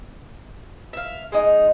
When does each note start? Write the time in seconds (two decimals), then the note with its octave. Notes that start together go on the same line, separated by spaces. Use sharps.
0.93 E5 F5
1.32 G#3 D#4